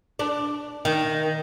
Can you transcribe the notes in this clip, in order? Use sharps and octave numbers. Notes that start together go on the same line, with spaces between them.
D4
D#3